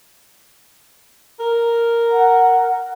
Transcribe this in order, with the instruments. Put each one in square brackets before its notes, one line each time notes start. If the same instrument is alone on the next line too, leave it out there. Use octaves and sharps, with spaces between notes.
[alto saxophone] A#4
[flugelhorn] F#5